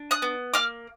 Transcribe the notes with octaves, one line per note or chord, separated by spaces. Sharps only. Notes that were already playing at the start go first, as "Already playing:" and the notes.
Already playing: D4
D#6 F#6
B3
A#3 D6 F6